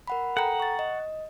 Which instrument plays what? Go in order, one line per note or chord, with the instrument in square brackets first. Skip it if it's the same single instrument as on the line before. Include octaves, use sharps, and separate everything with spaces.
[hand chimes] A#4 F#5 B5
[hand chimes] A4 G5 A#5 [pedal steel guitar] F#5
[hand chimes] C#6 A6
D#5